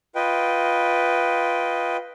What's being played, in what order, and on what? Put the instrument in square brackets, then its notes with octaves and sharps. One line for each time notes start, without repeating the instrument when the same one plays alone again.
[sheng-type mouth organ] F4 B4 D#5 G5